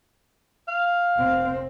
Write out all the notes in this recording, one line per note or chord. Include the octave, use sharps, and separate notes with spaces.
F5
F1 C4